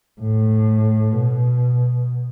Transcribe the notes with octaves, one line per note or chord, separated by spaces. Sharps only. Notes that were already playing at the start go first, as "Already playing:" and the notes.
A2
B2